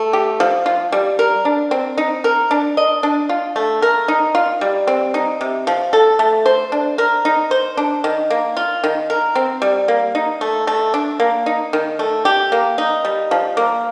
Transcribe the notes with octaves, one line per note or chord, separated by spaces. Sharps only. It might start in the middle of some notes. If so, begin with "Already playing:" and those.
Already playing: A3
G4
F3
F4
G3
A#4
D4
C4
D#4
A#4
D4
D#5
D4
F4
A3
A#4
D#4
F4
G3
C4
D#4
C3
F3
A4
A3
C5
D4
A#4
D#4
C5
D4
D#3
A#3
F4
D#3
A#4
C4
G3
A#3
D#4
A3
A3
D4
A#3
D#4
D#3
A3
G4
A#3
D#4
G3
F3
A#3